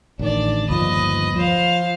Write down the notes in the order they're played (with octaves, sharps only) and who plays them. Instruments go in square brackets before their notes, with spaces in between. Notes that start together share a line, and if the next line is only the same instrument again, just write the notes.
[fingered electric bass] A1 D#3 [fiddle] D4 D5
[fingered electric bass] G1 D#2 F3 [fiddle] B4 D#5
[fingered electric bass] F3 [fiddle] C5 F5